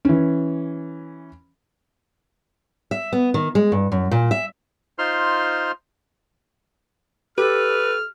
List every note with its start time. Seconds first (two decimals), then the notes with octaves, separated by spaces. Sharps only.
0.05 E3 C#4
2.91 E5
3.13 B3
3.34 D#3
3.55 G#3
3.72 G2
3.92 F#2
4.11 A#2
4.31 E5
4.99 D#4 F4 C5 C6 F6
7.38 G4 A4 B4 F6